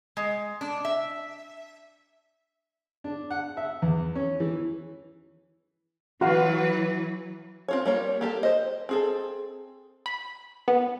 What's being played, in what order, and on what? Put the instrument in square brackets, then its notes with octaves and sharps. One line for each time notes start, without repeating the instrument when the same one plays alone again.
[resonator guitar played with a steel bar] G#3
D4
E5
[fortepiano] D4
F#5
E5
E2
C#4
E3
[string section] E3 F#3 B4 [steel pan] F#4 F5 F#5
[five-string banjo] C4 F4 C#5
G3 A#3 C#5
A#3 G4 A4
C5 D#5
C4 G#4 A4
[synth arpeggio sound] B5
B3